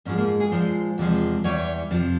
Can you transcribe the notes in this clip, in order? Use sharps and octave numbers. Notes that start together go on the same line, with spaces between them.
G#2 F3 G#3 C#4
A#3
G#4
A#2 F3 G#3 C5
E2 C3 F3 G#3
E2 E3 G3 C#5
F2 C3 F3